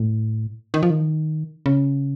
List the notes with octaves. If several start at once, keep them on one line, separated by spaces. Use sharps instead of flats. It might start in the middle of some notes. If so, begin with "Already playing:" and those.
Already playing: A2
D#3
F3
D#3
C#3